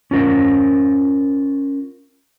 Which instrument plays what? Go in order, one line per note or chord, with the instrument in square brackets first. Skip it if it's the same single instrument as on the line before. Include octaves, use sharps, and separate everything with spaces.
[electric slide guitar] C#4 F4 A#4 C5